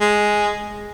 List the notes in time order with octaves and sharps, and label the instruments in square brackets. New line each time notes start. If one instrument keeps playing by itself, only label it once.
[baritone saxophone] G#3